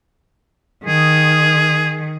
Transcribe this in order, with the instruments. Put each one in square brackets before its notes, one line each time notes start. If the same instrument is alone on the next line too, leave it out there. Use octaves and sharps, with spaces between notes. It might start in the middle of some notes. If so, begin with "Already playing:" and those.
[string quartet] D#3 [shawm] G#4